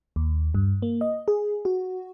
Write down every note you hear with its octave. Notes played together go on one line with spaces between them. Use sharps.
D#2
G2
A#3
D#5
G#4
F#4